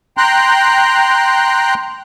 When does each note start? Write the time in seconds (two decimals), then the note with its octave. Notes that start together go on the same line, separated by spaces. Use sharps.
0.17 G5 A#5 C6 F#6